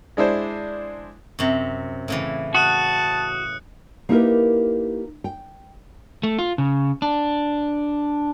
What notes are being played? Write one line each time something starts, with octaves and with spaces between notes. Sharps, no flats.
G#3 D4 E4 C5
F#2 C3
A2 C#3 E3
F#4 A5 D#6 F#6 C#7
A#3 D#4 E4 G4 A#4 B4
G5
A3
F4
C#3
D4